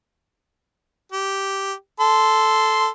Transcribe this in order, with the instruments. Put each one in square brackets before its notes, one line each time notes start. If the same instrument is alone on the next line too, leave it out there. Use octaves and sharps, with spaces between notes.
[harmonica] G4
A4 C6